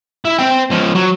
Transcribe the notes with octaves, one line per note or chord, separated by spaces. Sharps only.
E4
C4 G5
C#2 F3
F#3